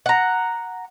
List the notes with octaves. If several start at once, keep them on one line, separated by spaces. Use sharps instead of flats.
F#5 A#5